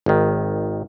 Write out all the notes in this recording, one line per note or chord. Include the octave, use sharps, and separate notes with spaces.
G#1 D#3